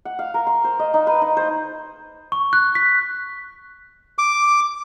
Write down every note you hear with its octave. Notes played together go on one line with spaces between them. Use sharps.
F#5
F5
A#4
C6
C5
D#5
D#4
B4
D#4
C5
C#6
F#6
B6
D6